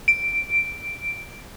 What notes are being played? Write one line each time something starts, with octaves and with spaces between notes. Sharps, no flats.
D7